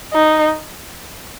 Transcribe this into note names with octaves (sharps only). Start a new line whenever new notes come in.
D#4